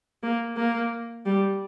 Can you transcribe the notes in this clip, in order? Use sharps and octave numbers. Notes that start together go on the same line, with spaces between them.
A#3
A#3
G3